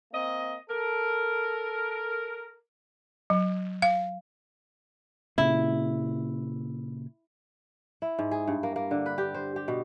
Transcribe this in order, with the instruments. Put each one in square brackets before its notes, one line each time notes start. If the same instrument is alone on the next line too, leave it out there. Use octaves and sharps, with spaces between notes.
[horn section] A#3 C4 D#5
A4 A#4
[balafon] F#3
F5
[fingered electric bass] A#2 C#3 [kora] E4
[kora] E4
G#2
G#4
G2
A#3
A#3
D3
B4
G4
C5
G4
B2